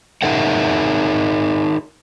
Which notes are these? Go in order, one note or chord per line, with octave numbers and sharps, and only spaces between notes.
D#4 G#4 A#4 E5 F#5